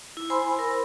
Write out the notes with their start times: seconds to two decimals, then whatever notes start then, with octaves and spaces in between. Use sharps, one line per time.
0.17 E4
0.30 C5 G#5 B5 C6 E6
0.59 A#4